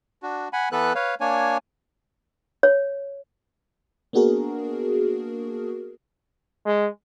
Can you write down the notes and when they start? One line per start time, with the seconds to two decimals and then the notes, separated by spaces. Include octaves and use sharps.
0.23 D4 F#4
0.53 F#5 G#5 B5
0.72 E3 B3 A4 B4 F#6
0.95 B4 C#5 F5
1.21 A#3 D4 C#5 G#5
2.63 C#5
4.13 A#3 B3 D4 F#4 G#4 A#4
6.66 G#3